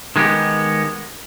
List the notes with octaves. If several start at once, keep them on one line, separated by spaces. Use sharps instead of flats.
D#3 G#3 B3 G4